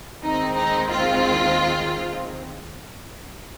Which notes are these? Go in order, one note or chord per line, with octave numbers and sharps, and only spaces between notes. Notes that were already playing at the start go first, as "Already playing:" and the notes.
D#2 D#3 G#3 C4 D#4
D#4
F4